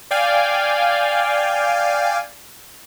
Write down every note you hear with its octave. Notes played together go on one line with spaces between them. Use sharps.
D5 F5 G5 G#5